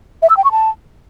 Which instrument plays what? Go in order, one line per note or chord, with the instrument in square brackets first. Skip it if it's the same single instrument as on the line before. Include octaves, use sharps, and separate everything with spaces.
[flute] E5
E6
G5
C#6
A5